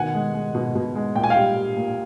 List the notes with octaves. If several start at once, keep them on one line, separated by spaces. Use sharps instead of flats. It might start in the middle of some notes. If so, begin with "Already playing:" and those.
Already playing: B2 D#3 F#5 G#5
G#3
G#3
B2
B2
G#3
A#2 G5
G#5
F5 G5
G3
G3
A#2